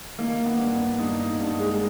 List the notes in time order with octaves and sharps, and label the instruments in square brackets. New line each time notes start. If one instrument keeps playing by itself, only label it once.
[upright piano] D#3 A#3
B3
G2
B3
G2 D#4
D#4
G2
G#3